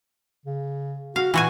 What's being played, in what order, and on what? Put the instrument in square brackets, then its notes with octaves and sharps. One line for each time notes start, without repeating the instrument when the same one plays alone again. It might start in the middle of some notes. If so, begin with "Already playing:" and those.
[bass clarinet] C#3
[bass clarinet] F#4 [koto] F5
[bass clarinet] A#2 [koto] E3 F#4 G#5